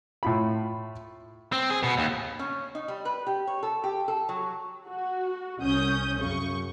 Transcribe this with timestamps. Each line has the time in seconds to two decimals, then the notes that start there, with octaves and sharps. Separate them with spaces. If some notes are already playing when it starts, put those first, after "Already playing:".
0.23 A2 F4 B5
1.52 C4
1.70 G#4
1.83 B2
1.98 D#2
2.39 C#4
2.75 D#4
2.88 G3
3.05 B4
3.27 G4
3.47 C#5
3.63 A4
3.84 G4
4.08 A4
4.29 F#3
4.87 F#4
5.60 C2 C#4 D#6 G6
6.19 F#2 C#3 C#6